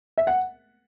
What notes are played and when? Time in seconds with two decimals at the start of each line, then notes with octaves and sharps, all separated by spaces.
0.18 E5
0.27 F#5